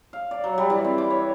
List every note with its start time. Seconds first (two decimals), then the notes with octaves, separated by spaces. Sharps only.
0.13 F5
0.31 D5
0.44 F#3
0.58 G3
0.70 E3
0.85 C4
0.98 D6
1.10 C#5